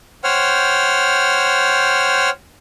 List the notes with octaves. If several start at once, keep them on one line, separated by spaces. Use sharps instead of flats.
C5 C#5 F#5 G5 F6